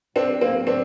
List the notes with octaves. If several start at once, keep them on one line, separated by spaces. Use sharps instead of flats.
A2 F#3 B3 C4 D4
A#3 C4
C4 D4